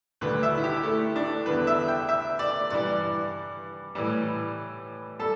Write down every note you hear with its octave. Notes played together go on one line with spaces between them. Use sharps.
D2 D3 G3 B4
E5
E4
G4
A3
D4
E2 D3 G3 B4
E5
G5
E5
D5
G2 E3 G3 D5
A2 E3 G3
G3 A4